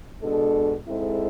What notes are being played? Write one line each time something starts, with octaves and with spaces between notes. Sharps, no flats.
B2 G#3 D4 A4
G#2 G#3 C4 E4 A4